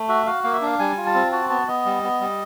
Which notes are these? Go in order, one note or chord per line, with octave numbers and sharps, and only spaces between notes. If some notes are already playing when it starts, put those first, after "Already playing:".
Already playing: A3
F#4 E5
F#4 F5
A#3 F5
E5
D4 F5
G3 G#5
F4
A5
C4
F#4 A5
B3 A5
B3 D#5
G3
B3
G3